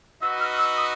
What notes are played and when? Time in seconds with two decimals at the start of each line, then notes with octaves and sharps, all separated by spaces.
0.21 D#4 F#4 B4 D#5 E6
0.40 F6
0.58 E6
0.77 D#6